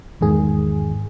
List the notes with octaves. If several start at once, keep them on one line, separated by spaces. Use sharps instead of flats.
E2 G#2 D#3 G#4